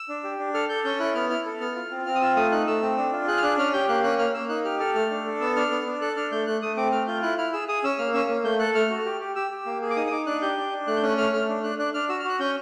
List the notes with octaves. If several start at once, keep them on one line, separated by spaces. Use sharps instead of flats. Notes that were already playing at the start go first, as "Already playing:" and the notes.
Already playing: E6
D4
G4
D4
A4 F6
A4 G6
C#4 G6
E4 F#6
B3 F6
E4 F6
A4
B3 F6
F4
C4
C4 F6
D#6
F4 E6
A3 D#6
D#4 F#6
A3 E6
C4
D4
F4
G#4 F#6
F6
D4 F#6
C#4 F6
G4 G6
A#3 F#6
C#4 F#6
A#3 F6
A#3 E6
D#4 F#6
G4 F6
A4 F6
A3 F6
D4
A4
B3 E6
D4 F6
B3
D4
A4 F#6
D4 F6
A3 G6
A3 F#6
A3 D#6
C4 D6
A3 F6
F4 G6
E4 F#6
E4 F6
G#4 E6
G#4 D#6
C#4 E6
A#3 F6
C#4 E6
A#3
A3 G6
A4 F#6
A3 F6
F#4
G4
G4
G4 E6
G4
A#3
G#4
D6
D#4 D#6
D#6
D#4 D6
D4 F#6
G4 G6
D4
D4
A3 F#6
G6
C#4 F#6
A3 F6
A3 F6
D4
D4 F#6
D4 F#6
D4 F6
F#4 E6
F6
F#4 F#6
C#4 G6